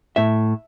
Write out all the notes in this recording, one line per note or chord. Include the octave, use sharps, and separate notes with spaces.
A2 E5